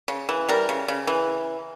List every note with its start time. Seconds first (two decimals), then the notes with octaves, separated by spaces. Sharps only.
0.08 C#3
0.29 E3
0.49 G3 A#4
0.69 C#3
0.88 C#3
1.07 E3